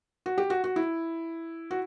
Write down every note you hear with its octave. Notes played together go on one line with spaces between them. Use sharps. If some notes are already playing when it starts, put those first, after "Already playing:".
F#4
G4
F#4
F#4
E4
F#4